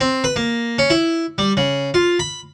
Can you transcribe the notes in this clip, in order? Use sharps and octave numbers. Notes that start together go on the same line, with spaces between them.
C4
B4
A#3
C#4
E4
G3
C#3
F4
B5